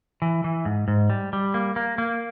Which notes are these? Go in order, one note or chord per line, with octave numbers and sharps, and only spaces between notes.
E3
E3
G#2
G#2
G3
G3
A#3
A#3
A#3